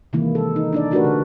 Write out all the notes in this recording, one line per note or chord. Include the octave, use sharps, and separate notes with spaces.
C3 D#3 E3 G#3 A#3 E4
G#3 A4
D#4
D4 D#4 D5
A3 D4 F#4 G4 A#4 B4
D3